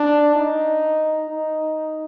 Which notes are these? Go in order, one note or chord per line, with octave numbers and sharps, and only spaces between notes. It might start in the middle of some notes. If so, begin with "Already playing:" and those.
Already playing: D4
D#4
D#4